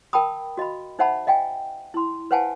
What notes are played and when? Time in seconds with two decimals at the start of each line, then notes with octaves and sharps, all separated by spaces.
0.13 A#4 G5 A5 B5 D#6
0.57 F#4 D#5 F5 B5
0.99 D#4 C5 E5 F#5 A5 B5
1.27 D#5 F5 G5 G#5
1.94 E4 C6
2.31 B4 C5 F5 F#5 G#5 A5